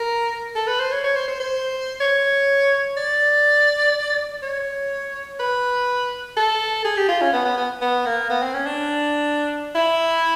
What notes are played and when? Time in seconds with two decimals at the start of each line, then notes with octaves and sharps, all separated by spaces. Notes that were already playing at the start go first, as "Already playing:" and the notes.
Already playing: A#4
0.55 A4
0.67 B4
0.80 C5
0.92 C#5
1.04 C#5
1.16 C5
1.28 C5
1.40 C5
2.00 C#5
2.97 D5
4.43 C#5
5.39 B4
6.36 A4
6.85 G#4
6.97 G4
7.09 F4
7.21 C#4
7.33 B3
7.45 B3
7.57 B3
7.81 B3
8.06 A#3
8.30 B3
8.42 C4
8.54 C#4
8.66 D4
9.75 E4